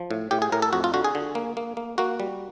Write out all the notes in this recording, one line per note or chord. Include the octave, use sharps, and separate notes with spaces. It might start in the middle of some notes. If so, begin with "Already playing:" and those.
Already playing: F3
A2
A2 G4
G#4
A2 A#4
A4
F2 F#4
F4
D3 F#4
G#4
D3
A#3
A#3
A#3
A#3 F#4
G3